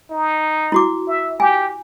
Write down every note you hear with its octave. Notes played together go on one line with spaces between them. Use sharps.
D#4
E4 F#4 D6
E5
G4 G#5